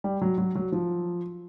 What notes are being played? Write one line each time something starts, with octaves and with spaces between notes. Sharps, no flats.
G3
F#3
F#3
F#3
F3